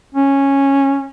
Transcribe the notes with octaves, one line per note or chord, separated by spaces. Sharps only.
C#4